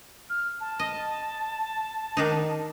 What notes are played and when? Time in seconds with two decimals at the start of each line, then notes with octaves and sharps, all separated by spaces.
0.30 F6
0.60 A5
0.79 D#5
2.17 D#3 D4 D#4